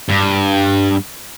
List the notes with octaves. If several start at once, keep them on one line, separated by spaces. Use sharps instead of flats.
G2